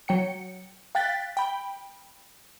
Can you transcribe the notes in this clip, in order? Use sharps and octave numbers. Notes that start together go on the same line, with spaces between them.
F#3 G5 C#7
F5 G5 F#6 A6 B6
G5 B5